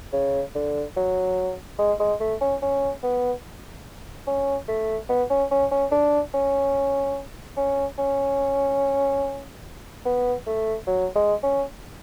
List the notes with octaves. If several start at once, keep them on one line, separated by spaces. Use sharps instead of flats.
C#3
D3
F#3
G#3
G#3
A3
C#4
C#4
B3
C#4
A3
B3
C#4
C#4
C#4
D4
C#4
C#4
C#4
B3
A3
F#3
G#3
C#4